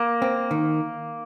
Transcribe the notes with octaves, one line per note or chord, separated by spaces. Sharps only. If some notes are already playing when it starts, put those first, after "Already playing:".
Already playing: A#3
C4
D#3